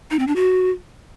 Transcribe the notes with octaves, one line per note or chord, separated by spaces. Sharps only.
D#4
C4
D4
F#4